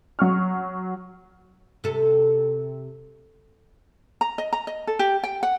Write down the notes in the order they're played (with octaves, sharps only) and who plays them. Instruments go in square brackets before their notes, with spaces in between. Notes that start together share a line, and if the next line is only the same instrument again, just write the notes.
[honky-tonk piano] F#3 C#6 F6
[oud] C3 A4
[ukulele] A#5
D#5
A#5
D#5
A4
G4
G5
F#5